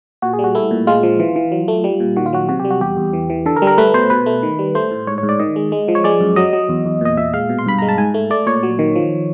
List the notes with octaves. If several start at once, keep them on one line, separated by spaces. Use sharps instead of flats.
A#2 F#4
G#4
G3
F#4
A3 E4
A#2
G#3 F4
F3
E3
E3
F#3
A3
G3
A#2
D#3 F#4
F4
F#3 F#4
C3 F#4
G4
G3
F#4
E2 G4
E2
E3
E3
D3 A4
A#4
G3
A#4
A3 B4
B2 C5
B2 B4
A3
D#3
G3
A3 C5
A2
G#2 C#5
C#5
G#2
D5
D#3 D#5
G#3
G#3
F3
C#5
G#3 D5
F#2
F#3 D#5
F#3
E2
E2
A#2 D#5
A#2 E5
G#3 F5
B2
C6
G2 B5
G#3 A#5
A5
G#2 G#5
A3
A3 D5
A#2 C#5
F#3
D#3
F3